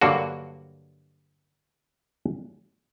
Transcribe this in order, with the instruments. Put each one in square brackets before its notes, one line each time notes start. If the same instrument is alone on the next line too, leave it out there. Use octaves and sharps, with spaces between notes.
[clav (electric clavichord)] G2 D3 F#3 A#3 F#4